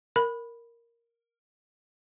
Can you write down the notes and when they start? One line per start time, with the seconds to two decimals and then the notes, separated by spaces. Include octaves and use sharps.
0.16 A#4 B5